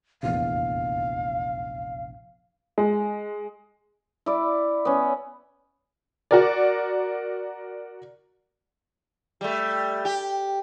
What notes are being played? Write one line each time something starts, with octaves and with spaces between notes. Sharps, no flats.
F1 A#1 E2 F5
G#3
E4 D5
B3 C#4
F#4 A#4 D5
G3 A3
G4